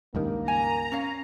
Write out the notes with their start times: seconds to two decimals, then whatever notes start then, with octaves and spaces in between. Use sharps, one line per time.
0.15 C#2 G2 D#3 A#3
0.48 G#5 A#5
0.92 C#4 C#5 F5